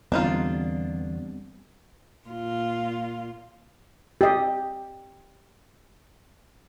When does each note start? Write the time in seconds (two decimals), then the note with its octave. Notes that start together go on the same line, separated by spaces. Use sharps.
0.12 E2 D3 G3 B3 C4 D4 D#4 F4
2.27 A#2 F4
4.21 G4 D#5